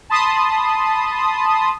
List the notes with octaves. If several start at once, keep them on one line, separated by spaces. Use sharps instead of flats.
A5 B5 C6 D#6